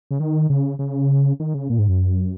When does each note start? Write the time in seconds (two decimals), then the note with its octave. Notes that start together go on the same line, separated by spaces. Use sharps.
0.11 C#3
0.20 D#3
0.50 C#3
0.79 C#3
1.40 D#3
1.54 C#3
1.70 A#2
1.79 G#2
1.89 F#2